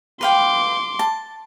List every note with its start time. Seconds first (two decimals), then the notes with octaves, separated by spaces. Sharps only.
0.21 B4 F5 G5 C6 D6
0.99 A5